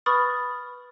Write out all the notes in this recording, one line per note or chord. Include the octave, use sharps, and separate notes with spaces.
B4 B5 C#6 D#6 F6 A6